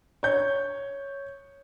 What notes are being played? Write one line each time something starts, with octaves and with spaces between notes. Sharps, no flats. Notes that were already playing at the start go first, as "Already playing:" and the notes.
C#5 G6